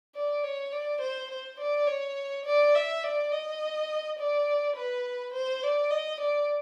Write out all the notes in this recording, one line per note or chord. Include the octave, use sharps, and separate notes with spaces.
D5
C#5
D5
C5
C5
D5
C#5
D5
E5
D5
D#5
D5
B4
C5
D5
D#5
D5